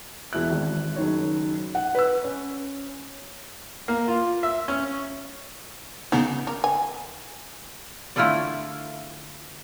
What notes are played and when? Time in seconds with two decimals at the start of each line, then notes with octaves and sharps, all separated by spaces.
0.33 E1 E4 E5 F#6
0.50 G#1
0.96 F#1 D#3 C#5
1.75 F#5
1.95 B4 E6
2.24 C#4
3.88 A#3
4.08 F4
4.43 E5
4.68 C#4
6.12 C#3 B3 C#4 D#4
6.47 A#3 A#4
6.64 G#5
8.16 D3 A3 E4 F4 A4 D5